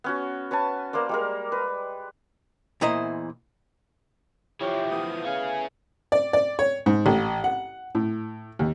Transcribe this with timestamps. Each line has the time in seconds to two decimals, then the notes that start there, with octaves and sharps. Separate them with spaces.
0.04 B3 C#4 F#4
0.51 B4 C#5 G#5 A5
0.93 A#3 A#4 C5 D5
1.09 G3 G#3 A#4
1.52 B4
2.81 E2 A#2 E4 C5 D#5 A#5
4.61 E3 F3 E4 G4 C#5
4.90 A3 B3 E4 D#6
5.25 C#4 G#4 F5 G#5
6.12 D5
6.33 D5
6.59 C#5
6.86 G#2
7.06 A1
7.44 F#5
7.95 A2
8.59 D#2